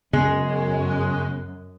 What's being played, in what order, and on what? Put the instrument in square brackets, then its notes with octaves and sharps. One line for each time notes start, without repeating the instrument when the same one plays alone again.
[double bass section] F#2 [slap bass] C#3 B3 [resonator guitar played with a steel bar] G#3